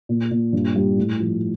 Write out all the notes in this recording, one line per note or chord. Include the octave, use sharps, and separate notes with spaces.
A#2
A#2
G2
G3
A2
F3